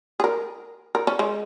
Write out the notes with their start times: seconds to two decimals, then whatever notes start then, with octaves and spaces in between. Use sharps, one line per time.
0.20 G#4
0.24 A#4
0.95 A#4
1.07 C#4
1.19 G#3